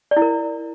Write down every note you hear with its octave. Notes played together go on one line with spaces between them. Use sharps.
D5
E4
A#4